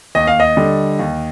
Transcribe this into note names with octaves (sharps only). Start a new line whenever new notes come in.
D#2 D#5
F5
D#5
D3 G3
D#2